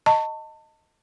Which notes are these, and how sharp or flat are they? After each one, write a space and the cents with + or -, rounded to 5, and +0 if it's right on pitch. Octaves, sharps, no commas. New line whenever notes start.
D#5 +0 A5 +30 C#6 +0